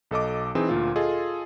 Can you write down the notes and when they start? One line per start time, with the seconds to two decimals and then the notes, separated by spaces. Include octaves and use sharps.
0.11 B1 A4 D#5 D6
0.55 E3 C4 D#4 G#4
0.69 D2 A#2 F4
0.96 F4 G#4 A4 D#5